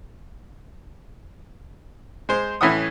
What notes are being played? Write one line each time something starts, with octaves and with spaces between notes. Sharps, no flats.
G#3 C5
A2 E3 C#4 E5 F#5 D#6